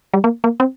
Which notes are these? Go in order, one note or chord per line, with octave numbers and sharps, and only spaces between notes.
G3
A#3
A#3
C4